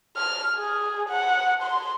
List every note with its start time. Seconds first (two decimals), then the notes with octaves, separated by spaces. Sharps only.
0.17 F6
0.56 G#4
1.09 F#5
1.63 C6